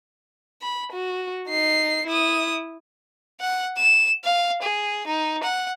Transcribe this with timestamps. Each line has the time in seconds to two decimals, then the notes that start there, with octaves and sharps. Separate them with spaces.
0.62 B5
0.92 F#4
1.48 D#4 C7
2.07 E4 D#6
3.40 F#5
3.77 E7
4.24 F5
4.62 G#4
5.06 D#4
5.43 F#5